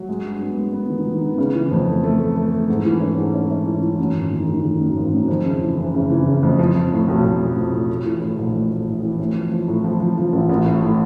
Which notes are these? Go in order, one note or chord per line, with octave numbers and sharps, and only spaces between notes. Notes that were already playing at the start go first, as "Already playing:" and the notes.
Already playing: F#3
G#3
G2
B3
G#3
B3
D#3
D#3
B3
C#3
E3
F2
A3
A3
A3
A3
A3
G#2
E3
C#4
G#2
C#4
C#4
E3
E3
F#2
G#1
D#3
D#3
D#3
F#2
G#1
F#2
F2
C#3
E3
F#1
C#3
E3
C#3
F2
F3
F3
A2
B1
B1
F3
F3
A2
A3
E3
A2
A#1
A3
A3
A2
E3
A2
F3
F3
A2
F3
F3
F3
A1
A1
A2
A2